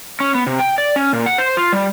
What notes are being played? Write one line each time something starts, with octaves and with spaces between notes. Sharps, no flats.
C#4
B3
C3
G5
D5
C#4
A#2
F#5
C5
F4
G3